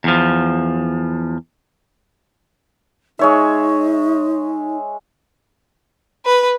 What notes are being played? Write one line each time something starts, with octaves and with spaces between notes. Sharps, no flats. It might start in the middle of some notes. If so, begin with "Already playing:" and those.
E2 F3
G#3 D#4 C#5 E5
B4